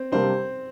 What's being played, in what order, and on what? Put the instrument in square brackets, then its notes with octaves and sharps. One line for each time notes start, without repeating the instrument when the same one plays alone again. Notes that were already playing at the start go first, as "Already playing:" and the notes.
Already playing: [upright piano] C4 C5
[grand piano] C3 G3 A#3 D4 [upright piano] C4 C5